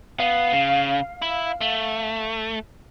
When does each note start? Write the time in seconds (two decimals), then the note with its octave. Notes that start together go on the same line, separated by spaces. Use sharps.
0.20 B3 F5
0.53 C#3
1.22 E4
1.61 A3